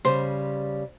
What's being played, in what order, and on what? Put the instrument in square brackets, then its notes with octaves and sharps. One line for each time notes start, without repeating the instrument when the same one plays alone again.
[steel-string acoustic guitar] C#3 G3 [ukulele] C5